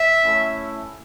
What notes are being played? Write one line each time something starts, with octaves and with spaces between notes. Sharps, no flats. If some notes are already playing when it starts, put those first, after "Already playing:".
Already playing: E5
A3 C#4 E4